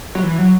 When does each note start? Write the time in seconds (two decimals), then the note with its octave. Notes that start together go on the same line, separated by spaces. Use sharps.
0.15 F#3
0.23 E3
0.38 F#3